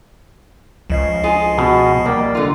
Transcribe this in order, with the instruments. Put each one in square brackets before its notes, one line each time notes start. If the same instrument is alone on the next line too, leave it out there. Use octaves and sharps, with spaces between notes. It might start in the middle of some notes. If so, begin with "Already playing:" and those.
[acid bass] C#2 [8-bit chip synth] F3 D#5 C7
[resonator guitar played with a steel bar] F4 G#4
[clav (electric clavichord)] B2
[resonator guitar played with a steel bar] G3 [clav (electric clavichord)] A#3
[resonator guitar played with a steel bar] D3 F4